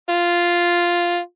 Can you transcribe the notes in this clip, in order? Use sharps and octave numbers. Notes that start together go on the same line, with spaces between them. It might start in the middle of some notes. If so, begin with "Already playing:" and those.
F4